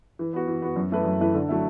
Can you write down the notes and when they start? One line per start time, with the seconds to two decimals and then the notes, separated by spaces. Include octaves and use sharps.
0.19 E3
0.33 B3 F#4
0.48 E3
0.62 B3 F#4
0.76 F#2
0.92 E3 A3 E4 B4
1.05 F#2
1.20 E3 A3 E4 B4
1.34 D3
1.49 F#3 A3 E4